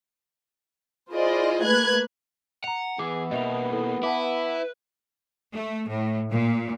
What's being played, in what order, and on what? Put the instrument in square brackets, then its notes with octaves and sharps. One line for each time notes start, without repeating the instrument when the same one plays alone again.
[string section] E4 F4 G#4 C5 D5 D#5
A3 A#3 B4 F#6 G#6
[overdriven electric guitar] F#5 [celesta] A#5 F7
[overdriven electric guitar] E3 [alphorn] B3 [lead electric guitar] G#4 [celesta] D6
[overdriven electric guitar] B2 [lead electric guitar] G3 A#3 [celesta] D#5 E5 F7
[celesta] E4 A4
[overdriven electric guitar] E4 [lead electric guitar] B4 [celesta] F#5 A5 D6
[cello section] A3
A2
A#2